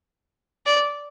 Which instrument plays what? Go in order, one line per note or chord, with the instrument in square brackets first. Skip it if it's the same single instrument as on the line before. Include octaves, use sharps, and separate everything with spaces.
[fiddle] D5